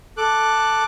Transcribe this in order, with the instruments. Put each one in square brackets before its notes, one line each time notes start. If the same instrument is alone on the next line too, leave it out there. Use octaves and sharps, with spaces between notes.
[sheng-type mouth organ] A4 D6 F#6